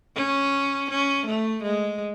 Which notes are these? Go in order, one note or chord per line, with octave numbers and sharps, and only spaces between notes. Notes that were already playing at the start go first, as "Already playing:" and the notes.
C#4
C#4
A3
G#3